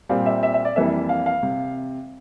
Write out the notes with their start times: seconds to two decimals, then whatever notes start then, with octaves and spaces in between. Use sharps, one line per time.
0.09 A#2 G3 C4 F5
0.26 E5
0.43 E5
0.54 E5
0.65 D5
0.76 F2 E3 G3 A#3 E5
1.09 F5
1.26 F5
1.43 C3